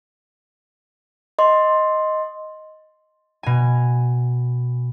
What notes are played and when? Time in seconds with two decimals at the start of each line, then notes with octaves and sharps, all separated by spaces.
1.39 D#5 C6
3.43 B2 G#5